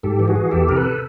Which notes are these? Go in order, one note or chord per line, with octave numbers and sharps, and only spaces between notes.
G#2 G4 A4
E3
F#4 G#4
E3
E2 G4 A4
C3 A#4
A4 B4